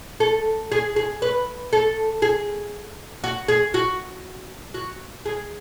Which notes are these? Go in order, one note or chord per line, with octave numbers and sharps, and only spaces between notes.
A4
G#4
G#4
B4
A4
G#4
F#4
G#4
F#4
F#4
G#4